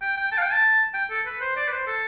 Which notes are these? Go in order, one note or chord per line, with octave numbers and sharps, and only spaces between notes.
G5
G5
A5
F5
G5
A5
G5
A4
B4
C5
D5
B4
C5
A4